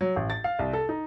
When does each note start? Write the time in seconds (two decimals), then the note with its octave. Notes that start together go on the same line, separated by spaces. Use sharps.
0.01 F#3
0.16 A1
0.30 A6
0.44 F5
0.59 C2
0.73 A4
0.89 D#4